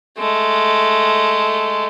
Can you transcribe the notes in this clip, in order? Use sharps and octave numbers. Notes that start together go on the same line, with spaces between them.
G#3 A3